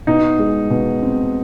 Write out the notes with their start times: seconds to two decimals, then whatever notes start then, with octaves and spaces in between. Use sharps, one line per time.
0.07 B2 D#4
0.39 G#3
0.70 B2
1.03 C4